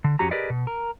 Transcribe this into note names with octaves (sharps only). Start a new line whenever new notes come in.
D3
F2 C#4 F#4 G4 A#5
G4 G#4 A#4 B4 D5 D#5
B2
A#4